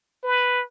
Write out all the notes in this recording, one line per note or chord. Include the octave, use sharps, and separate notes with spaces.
B4